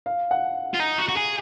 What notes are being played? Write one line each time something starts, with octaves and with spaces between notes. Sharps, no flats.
F5
F#5
F4
D#4 A#5
F#4
F#4
G#4